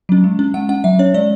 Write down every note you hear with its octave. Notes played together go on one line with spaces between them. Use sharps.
F#3 C#4
G#3
C#4
G#3 F#5
C#4 F#5
F#3 E5
C#4 C#5
G#3 D5